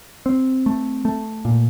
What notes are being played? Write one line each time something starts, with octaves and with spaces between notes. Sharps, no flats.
C4
A3
A3
A#2